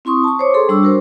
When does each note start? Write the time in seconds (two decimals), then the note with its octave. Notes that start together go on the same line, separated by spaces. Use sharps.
0.05 C4 E4 C6 C#6 D#6
0.24 A5 C#6
0.39 C5 C#5 D6
0.54 G#4 A4 C6
0.69 G3 D4 C#6 E6
0.83 F#4 A#4 C5